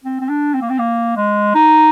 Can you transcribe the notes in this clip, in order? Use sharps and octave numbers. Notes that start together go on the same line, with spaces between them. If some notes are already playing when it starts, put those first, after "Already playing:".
C4
C4
D4
C4
A#3
C4
A#3
G#3
D#4